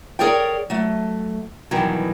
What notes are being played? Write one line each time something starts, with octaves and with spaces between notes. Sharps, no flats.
G#4 A#4 C#5 D5 G5
F#3 A3
G2 B2 D#3 E3 F#3